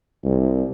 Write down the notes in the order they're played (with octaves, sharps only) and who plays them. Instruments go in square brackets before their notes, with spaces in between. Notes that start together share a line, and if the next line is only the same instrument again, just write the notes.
[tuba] C2